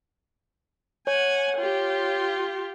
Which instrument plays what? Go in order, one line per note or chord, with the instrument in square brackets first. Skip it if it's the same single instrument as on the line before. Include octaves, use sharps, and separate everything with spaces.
[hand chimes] C#5 [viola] F#5 G#5
[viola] F4 G4